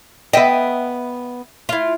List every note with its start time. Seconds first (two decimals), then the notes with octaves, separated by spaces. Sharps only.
0.33 B3 D#5 E5 G5
1.69 E4 F4